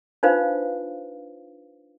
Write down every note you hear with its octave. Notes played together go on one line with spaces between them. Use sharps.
D4 D#4 F4 B4 C5 F5